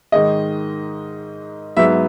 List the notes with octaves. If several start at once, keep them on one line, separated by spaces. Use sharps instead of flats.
G#2 D#3 G#3 D#5
G#2 F#3 B3 E5